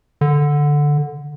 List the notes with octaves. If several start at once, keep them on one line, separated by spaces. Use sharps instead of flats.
D3